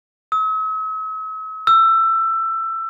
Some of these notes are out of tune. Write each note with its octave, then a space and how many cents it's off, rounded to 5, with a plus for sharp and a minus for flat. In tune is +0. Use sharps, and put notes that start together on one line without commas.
E6 -45
E6 +20